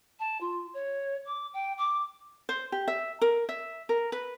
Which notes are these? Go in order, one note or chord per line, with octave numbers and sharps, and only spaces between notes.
A5
F4
C#5
D6
G5
D6
C5
G4
E5
A#4
E5
A#4
B4